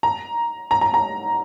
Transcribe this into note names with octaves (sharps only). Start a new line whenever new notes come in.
A#5
A#5
A#5
A#5